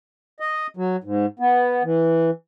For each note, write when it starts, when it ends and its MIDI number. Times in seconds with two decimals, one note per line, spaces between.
0.40 0.67 75
0.77 0.96 54
1.04 1.26 44
1.39 1.83 59
1.84 2.31 52